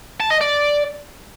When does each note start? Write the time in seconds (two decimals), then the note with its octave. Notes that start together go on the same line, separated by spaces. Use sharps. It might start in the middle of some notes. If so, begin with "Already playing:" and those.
0.20 A5
0.30 D#5
0.41 D5